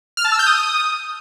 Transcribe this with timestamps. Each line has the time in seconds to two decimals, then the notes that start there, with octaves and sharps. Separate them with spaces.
0.17 F6
0.25 A5
0.32 E6
0.39 G6
0.47 D#6